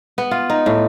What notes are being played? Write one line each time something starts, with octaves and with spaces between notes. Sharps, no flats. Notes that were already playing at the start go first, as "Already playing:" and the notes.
B3
F4
D#4
A2